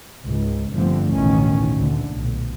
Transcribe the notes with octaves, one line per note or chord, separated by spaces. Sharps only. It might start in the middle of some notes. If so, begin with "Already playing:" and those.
C#2 G#2
G1 G2 D3 F3 A3 C4
A1 D2 B2 D#3 E3 C#4
D2 A#2 D3 A3
B1 A#2